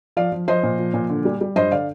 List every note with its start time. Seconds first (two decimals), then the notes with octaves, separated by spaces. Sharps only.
0.17 F3 D5 F5
0.32 F3
0.48 F3 C5 D#5
0.63 A#2
0.79 F3
0.94 A#2
1.10 D3
1.25 G3
1.41 G3
1.56 G2 C5 D#5
1.72 D3 D5 F5